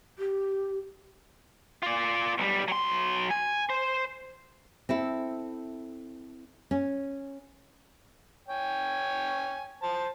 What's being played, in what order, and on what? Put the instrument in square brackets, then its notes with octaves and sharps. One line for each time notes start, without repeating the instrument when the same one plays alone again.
[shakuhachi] G4
[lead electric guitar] F4 D5
B1 G3
F#3 C6
G#5
C5
[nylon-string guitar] C4 E4 A4
C#4
[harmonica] C#5 G5 G#5
C5 A5